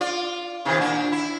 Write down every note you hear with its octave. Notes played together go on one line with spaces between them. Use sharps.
F4 D5
C3 D#3 E3
A#2 D4
E4